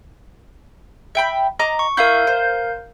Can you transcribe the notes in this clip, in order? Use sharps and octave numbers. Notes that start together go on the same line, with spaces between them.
E5 G5 B5
D#5 A#5 D6
C#6
E4 A#4 F5 G6
C5